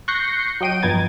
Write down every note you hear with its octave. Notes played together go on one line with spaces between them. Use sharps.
C#6 F#6 G6 A#6 C7 C#7
F#3 D#5 G5 D7 D#7
G2 F3 B3 A#5 G#6 A6